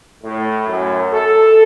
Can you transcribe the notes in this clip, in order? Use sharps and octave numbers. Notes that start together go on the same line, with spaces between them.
A2
F#2
A4